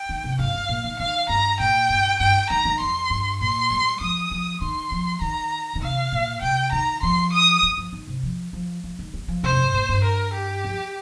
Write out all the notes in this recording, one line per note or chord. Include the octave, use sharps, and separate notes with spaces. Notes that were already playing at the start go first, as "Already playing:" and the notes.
Already playing: G5
D#3
C3
G2 F5
G2
A#2
D#3
D#3 F5
G2 A#5
A#2 G5
G2
G2 G5
D#3 A#5
D#3
F2 C6
G2
A#2 C6
G3
F3 D#6
F3
D#3 C6
F3
D#3 A#5
D#3
C3 F5
A#2
C3 G5
D#3 A#5
F3 C6
D#6
G3
F3
D#3
C3
F3
F3
F3
D#3
G3
F3
C3 C5
F2
G2
A#2
G2
A#4
G4
F2